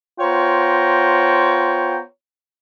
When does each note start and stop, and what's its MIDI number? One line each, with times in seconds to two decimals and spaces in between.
0.20 2.00 59
0.20 2.00 65
0.20 2.00 72
0.20 2.00 73
0.20 2.00 79
0.20 2.00 82